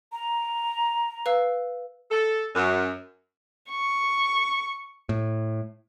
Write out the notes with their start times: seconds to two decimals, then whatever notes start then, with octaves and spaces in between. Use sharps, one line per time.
0.12 A#5
1.26 B4 F5 E6
2.11 A4
2.55 F#2
3.70 C#6
5.09 A2